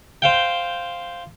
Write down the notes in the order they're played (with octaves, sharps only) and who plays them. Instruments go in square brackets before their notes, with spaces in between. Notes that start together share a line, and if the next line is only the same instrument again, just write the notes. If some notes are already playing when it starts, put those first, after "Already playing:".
[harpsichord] C5 F5 G5